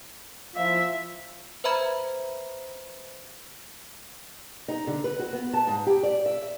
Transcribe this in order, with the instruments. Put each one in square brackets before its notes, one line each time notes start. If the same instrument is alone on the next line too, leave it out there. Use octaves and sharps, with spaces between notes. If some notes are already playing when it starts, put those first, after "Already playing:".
[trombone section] F3 E4 F4 [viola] E5
[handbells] B4 C5 E5 A#5 B5 G#6
[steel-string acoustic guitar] D#4
D3
B4
F#4
B3
A5
G#2
G4
D5
E5